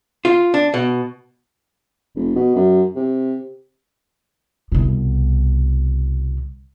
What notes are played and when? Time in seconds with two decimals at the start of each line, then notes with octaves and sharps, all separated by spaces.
0.25 F4
0.54 D4
0.74 B2
2.15 F1
2.36 B2
2.55 F#2
2.96 C3
4.72 C2 B2